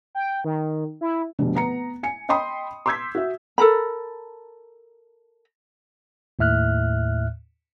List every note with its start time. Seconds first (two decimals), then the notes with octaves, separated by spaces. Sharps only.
0.15 G5
0.44 D#3
1.01 E4
1.39 F1 B2 D3
1.55 B3 A#5 C#7
2.03 G#5 C#7
2.29 D#5 G5 B5 C6 D#6
2.86 C6 D6 E6 G6 G#6 B6
3.15 F#4 E5
3.58 A4 A#4 A#5 B5
6.39 D#2 A2 E5 F6 F#6